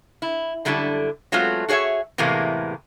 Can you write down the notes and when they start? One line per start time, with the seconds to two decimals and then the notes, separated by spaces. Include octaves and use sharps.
0.22 E4
0.65 F#2 D3 G3 E4 A4
1.32 F#3 G#3 A3 B3 C4 F4
1.68 F#4 G#4 C#5 D#5 E5
2.18 E2 A2 C3 E3 G#3 A#3